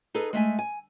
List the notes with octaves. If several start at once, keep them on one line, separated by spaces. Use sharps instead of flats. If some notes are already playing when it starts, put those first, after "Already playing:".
D#4 G#4 A4 B4
G#3 A3 E5 G#5
G#5